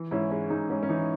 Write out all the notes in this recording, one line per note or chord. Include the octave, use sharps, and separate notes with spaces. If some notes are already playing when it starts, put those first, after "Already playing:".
Already playing: E3
G#2 C#4 E4
G#3 C#4
G#2 D#4
G#2 C#4
C#4
E3 D#4